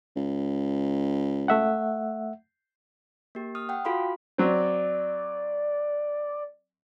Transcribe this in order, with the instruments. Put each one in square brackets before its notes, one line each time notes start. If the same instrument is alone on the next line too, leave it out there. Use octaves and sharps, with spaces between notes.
[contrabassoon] C#2
[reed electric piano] A3 E5 F#5
[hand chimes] A#3 G4
D#6 F6
F#5 G5
F4 F#4 A4 F5 B5 C6
[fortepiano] F#3 C4 [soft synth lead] D5